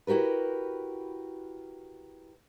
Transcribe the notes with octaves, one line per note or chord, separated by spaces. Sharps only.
E4 F#4 G4 A#4 B4